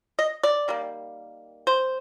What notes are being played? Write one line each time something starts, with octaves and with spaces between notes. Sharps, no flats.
D#5
D5
D#3 G3 A#3
C5